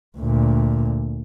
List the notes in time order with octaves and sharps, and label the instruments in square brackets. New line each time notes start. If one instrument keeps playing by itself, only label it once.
[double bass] D2 A#2